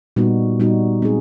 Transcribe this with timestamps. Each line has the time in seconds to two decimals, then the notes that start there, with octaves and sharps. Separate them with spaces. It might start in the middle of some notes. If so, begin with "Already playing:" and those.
0.16 A#2 G3 B3 D#4 F#4
0.60 A#2 G3 B3 D#4 F#4
1.02 G#3 C4 D#4 G#4